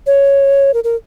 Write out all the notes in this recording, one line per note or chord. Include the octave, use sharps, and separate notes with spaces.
C#5
A#4
A#4